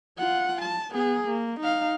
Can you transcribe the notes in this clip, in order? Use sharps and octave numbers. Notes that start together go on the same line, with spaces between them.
F4 F#5
A5
B3 G#4
A#3
D#4 F5